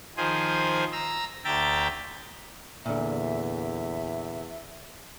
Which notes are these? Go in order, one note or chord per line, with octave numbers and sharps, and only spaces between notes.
D#3 F3 G#4 C5 G#5
A#5 E6
D2 E5 G5 A#5 A6
E2 A#2 D3 E5